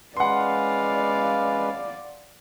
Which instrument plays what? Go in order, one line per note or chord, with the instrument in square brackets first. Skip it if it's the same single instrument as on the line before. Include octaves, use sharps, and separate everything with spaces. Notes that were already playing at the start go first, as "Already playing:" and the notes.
[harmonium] G#3 C#4 B4 [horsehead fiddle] D5 [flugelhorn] F5 [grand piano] F#5 C6